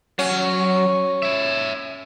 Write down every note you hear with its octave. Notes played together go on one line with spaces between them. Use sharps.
F#3 C#4
C#5 E5